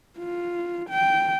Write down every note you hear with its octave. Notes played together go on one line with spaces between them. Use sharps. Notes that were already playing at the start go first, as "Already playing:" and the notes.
F4
G5